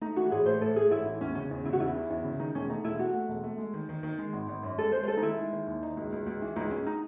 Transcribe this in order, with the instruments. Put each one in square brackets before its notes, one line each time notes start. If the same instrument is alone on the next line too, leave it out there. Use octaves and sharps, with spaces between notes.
[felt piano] A3 [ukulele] D#4
[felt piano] E3 [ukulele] F#4
[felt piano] A1 [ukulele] G#4
[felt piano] A3 [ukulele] C5
[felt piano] A2 [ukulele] A4
[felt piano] A3 [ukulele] G#4
[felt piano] A1 [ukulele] E4
[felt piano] E3
[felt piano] E2 [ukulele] C#4
[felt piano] C#3 [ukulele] C#4
[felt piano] E2
[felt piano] C#3 [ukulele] E4
[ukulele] F#4
[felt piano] E2 [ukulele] E4
[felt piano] E3
E2
C#3
[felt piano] D#3 [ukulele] D#4
[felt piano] E1 [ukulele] C#4
[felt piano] A3 [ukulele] D#4
[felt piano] E1 [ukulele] E4
[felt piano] A3 [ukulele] F#4
[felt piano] A3
E1
A3
G#3
D#3
D#3
D#3
G#3
G#1
G#1
F#2
[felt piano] G#3 [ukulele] A4
[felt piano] G#3 [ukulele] C5
[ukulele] C5
[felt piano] G#3 [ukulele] A4
[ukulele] D#4
[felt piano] D#3 [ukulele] E4
[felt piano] G#3
D#3
D#2
D#4
C#2
C#2
C#2
E3
[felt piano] C#2 [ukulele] D#4
[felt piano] C#2 [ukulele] C#4
[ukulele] D#4